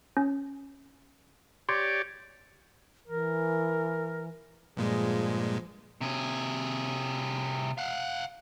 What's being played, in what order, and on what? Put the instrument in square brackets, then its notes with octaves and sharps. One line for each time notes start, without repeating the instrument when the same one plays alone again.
[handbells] C#4
[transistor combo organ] G4 C#5 D5 [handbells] C6
[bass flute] E3 [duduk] A#4
[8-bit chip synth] G2 A#2 G#3 [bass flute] F3 [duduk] G#4
[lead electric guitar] C3 G#4
F5 F#5